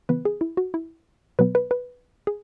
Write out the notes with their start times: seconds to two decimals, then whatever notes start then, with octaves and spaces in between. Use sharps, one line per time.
0.09 C#3 E3 B3 B4
0.25 G#4
0.41 E4
0.57 F#4
0.74 E4
1.39 B2 F#3 B3 B4
1.55 B4
1.71 B4
2.27 G#4